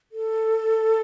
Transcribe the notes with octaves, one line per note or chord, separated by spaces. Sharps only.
A4